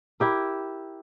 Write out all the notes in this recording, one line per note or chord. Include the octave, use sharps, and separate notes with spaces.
E4 G4 A#4